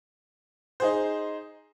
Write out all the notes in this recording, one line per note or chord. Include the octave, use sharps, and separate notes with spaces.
D#4 G#4 C5